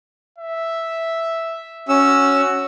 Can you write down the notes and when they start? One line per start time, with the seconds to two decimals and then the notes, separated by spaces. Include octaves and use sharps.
0.38 E5
1.89 C#4 F#4 E6